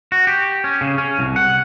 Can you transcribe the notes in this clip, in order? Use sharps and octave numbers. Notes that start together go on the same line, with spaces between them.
F#4
G4
C#4
C#3
C#4
C2
F#5